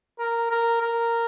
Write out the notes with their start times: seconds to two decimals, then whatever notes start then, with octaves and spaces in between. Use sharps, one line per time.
0.19 A#4
0.51 A#4
0.82 A#4